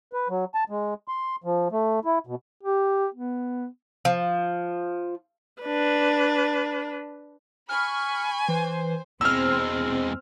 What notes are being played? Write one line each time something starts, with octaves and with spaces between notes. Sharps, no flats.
B4
F#3
A5
G#3
C6
F3
A3
E4
B2
G4
B3
F3
D4 B4
G#5 B5 C#6 F6
E3 C5
E2 G#3 C4 E6 F6